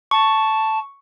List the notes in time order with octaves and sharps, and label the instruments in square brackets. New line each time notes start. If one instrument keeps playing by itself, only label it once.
[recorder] A5 [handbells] C#6